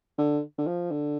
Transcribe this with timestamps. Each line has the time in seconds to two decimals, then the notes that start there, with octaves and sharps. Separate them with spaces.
0.18 D3
0.58 D3
0.67 F3
0.91 D3